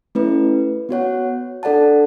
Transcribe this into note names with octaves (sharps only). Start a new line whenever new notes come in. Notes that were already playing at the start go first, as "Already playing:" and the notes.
A3 C#4 E4 B4
B3 F#4 C#5 F#5
D4 A4 D5 F#5 A5